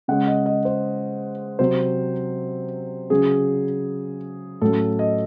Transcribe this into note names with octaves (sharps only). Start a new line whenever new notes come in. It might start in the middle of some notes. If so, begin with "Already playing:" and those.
C#3 G#3 C#4 F#5
D#5
D#5
C5
C3 F#3 C4 C5
C#3 F#3 C#4 G#4
A2 F#3 C#4 A4
D#5